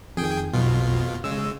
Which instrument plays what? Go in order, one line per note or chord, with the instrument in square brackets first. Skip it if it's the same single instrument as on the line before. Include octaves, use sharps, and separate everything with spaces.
[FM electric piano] F2 D#3 [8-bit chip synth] G#4 G5
[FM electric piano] B1 [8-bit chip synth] F2 B2 F4
[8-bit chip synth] C#3 G#3 [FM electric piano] E6